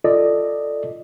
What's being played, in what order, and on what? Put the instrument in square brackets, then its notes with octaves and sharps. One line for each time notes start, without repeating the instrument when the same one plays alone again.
[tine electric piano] F4 A4 D5 D#5